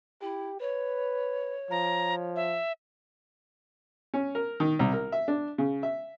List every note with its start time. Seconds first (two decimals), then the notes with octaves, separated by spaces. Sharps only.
0.22 E4 G4
0.60 B4 C#5
1.71 F3 A#5
2.36 E5
4.14 C#4
4.35 A#4
4.60 D#3
4.79 C2
4.93 A#4
5.12 E5
5.28 D4
5.58 C#3
5.83 E5